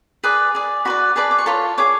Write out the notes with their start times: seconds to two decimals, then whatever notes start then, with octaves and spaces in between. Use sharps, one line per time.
0.24 G#4 B4 D5
0.55 G#4 D5
0.85 F#4 B4 D5 B5
1.16 G#4 B4 D5 A5
1.31 D6
1.38 C#6
1.46 F4 A4 C#5 B5
1.78 G#4 C#5 D6